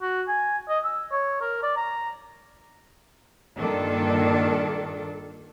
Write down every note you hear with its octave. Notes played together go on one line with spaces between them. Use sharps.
F#4
G#5
D#5
E6
C#5
A#4
D5
A#5
G2 A#2 D#3 D4 A4